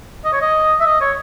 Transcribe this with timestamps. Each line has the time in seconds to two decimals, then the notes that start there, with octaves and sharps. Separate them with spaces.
0.25 D#5
0.32 C#5
0.41 D#5
0.80 E5
0.86 D#5
1.01 C#5